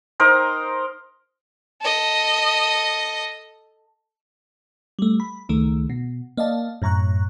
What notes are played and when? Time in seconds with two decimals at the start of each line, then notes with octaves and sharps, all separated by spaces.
0.20 D#4 A#4 C5 D#5
1.82 A4 D#5
4.99 G3 A3
5.20 B5
5.49 C#2 D#3 A3
5.90 B2
6.37 A#3 D5 D#5 F5 A5
6.82 F#2 A2 A#5 C#6 F#6